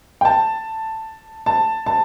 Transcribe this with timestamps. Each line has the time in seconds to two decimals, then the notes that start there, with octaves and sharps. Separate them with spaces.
0.21 G5
0.25 A5
1.46 A5
1.86 A5